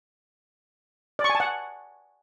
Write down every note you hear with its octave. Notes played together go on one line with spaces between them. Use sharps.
D5
C#6
G#5
A5
F#5